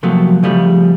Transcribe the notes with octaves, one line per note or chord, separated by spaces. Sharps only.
C3 F3 F#3 A3 A#3
C#3 F3 G3 A3